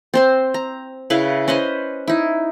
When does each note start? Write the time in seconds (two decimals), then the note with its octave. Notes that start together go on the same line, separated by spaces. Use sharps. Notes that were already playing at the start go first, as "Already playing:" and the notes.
0.14 C4 C5 C6
0.54 A#5
1.10 C#3 E4 B4 F5
1.48 C#4 B4 C5 D#5
2.08 D#4 E4